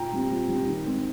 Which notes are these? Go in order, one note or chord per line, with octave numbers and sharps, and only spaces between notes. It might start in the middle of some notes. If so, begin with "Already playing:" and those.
Already playing: A#2 G5 A#5
G3 C4
A#2
G3 C4
D#3
G#3 C4